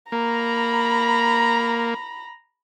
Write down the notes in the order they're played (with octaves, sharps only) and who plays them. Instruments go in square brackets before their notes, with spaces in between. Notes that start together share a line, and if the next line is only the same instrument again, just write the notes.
[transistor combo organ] A#3 [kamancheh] A#5 B5